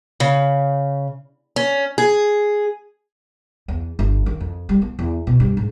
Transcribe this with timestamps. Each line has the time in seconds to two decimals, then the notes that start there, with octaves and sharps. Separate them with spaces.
0.20 C#3
1.56 C#4
1.98 G#4
3.68 E2
3.99 G1
4.26 D#3
4.41 F2
4.69 G3
4.82 B3
4.99 E2
5.27 B2
5.40 G2
5.57 G#2